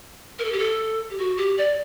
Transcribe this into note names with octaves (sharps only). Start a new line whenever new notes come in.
A#4
A4
G4
A4
G4
F#4
G4
D5